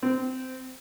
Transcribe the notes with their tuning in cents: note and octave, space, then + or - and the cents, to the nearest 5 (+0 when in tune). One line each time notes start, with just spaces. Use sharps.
C4 -20